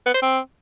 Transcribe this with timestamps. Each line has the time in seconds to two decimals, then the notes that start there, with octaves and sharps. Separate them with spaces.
0.06 B3
0.14 C5
0.22 C4